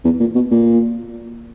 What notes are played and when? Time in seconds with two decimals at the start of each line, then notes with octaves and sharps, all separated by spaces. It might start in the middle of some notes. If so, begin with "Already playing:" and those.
0.05 E2
0.20 A#2
0.35 B2
0.51 A#2